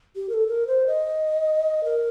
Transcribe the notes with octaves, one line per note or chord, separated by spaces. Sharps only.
G4
A#4
A4
A#4
C5
D#5
A#4